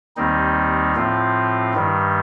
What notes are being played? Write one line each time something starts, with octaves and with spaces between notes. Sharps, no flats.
D#2 D#3 G3 C4 D#4
A2 F3 C4 F4
G2 D#3 G3